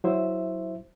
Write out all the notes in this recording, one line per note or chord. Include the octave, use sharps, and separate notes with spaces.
F#3 E4 C5 E5